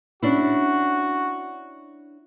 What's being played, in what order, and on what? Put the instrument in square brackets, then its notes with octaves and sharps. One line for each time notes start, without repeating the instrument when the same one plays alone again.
[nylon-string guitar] C#4 D4 E4 [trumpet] F#4